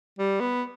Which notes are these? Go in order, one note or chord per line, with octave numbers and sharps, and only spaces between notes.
G3
B3